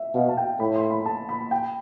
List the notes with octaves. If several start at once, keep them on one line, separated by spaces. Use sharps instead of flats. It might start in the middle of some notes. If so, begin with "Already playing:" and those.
Already playing: E5
B2 F5
A5
G5
A2 B5
C6
B5
A5
B5
G5